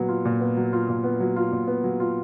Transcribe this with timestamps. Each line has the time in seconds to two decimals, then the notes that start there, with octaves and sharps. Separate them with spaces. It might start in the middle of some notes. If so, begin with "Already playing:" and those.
Already playing: A#2 F#3 B3
0.09 F4
0.25 A#2
0.41 B3
0.57 F#3
0.73 F4
0.89 A#2
1.04 B3
1.20 F#3
1.36 F4
1.52 A#2
1.67 B3
1.84 F#3
2.00 F4